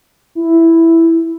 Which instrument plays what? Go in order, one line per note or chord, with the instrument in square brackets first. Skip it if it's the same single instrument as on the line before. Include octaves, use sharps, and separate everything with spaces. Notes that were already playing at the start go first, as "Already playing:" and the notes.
[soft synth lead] E4